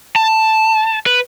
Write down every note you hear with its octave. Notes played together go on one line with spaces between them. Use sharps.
A5
B4